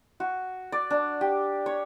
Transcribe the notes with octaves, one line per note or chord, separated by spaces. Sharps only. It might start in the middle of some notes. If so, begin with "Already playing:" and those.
F#4
D5
D4
G4
C#5